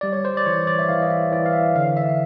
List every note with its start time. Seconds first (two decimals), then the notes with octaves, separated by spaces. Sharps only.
0.01 G3 D5
0.13 C#5
0.25 C5
0.37 D5
0.46 E3 C#5
0.67 D5
0.79 E5
0.89 E3 F5
1.02 D#5
1.10 E5
1.31 E3 D5
1.46 F5
1.53 E5
1.75 D3 F5
1.97 E5